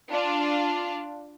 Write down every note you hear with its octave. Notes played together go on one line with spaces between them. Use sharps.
D4 F4